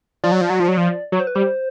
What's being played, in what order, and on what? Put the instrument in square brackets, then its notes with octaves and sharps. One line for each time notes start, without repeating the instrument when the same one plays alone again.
[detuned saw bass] F3 [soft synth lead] D5
[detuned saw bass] F#3
F3
F#3
F3
F#3
F3
[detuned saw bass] F#3 [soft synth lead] C#5
[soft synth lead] C5
B4
[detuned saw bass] G3 [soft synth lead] C5